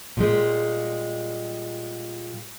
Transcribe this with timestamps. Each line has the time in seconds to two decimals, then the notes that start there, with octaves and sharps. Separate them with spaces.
0.17 A#2 G3 G#3